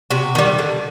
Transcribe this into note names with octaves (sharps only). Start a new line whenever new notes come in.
C3 F#4
D#3 G3
D3